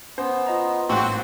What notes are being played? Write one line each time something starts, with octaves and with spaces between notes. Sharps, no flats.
B3 C#4 C5
F4 D#5 A#5
A1 G#2 A#3 C4 F#4 G5 F#6